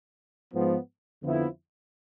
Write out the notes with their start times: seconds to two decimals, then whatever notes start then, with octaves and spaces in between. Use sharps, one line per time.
0.53 G#2 F3 B3
1.23 F2 D3 F3 B3 E4